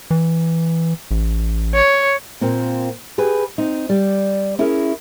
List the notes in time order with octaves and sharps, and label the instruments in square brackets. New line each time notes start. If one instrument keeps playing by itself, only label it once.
[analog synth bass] E3
A1
[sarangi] C#5
[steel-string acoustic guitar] A#2 A#3 C4
G4 G#4 B4
C4 D#4
G3 D5
C#4 E4 G#4 A#4